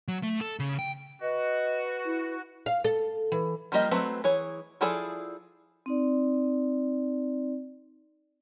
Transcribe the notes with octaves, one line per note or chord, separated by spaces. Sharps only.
F#3
A3
A4
C#3
G5
F#4 B4 D#5
E4
F5
A4
E3
F3 G3 A#3 G4 D#5
F#3 A3 C4 B4
E3 G#4 C#5
F3 E4 G#4 A4 D5
C4 D#4 D5